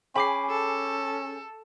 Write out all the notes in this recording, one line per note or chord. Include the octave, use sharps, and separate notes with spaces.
C#4 G#4 G5 G#5 B5 D6 C7
A4